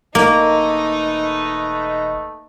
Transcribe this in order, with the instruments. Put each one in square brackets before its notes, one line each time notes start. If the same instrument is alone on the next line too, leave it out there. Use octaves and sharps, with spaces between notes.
[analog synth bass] E1 [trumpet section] A3 B4 D#5 [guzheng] A#3 [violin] D#4